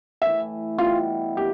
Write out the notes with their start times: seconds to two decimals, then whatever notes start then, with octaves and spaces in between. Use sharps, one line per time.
0.21 A2 E3 A3 E4 E5
0.78 B2 G3 B3 F4
1.37 C3 F3 G4